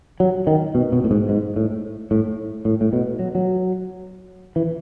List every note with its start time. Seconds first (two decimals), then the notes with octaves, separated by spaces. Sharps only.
0.20 F#3
0.47 D#3
0.75 B2
0.92 B2
1.04 A2
1.11 G#2
1.29 G#2
1.56 A2
2.11 A2
2.65 A2
2.81 A2
2.93 B2
3.19 F#3
3.35 F#3
4.56 E3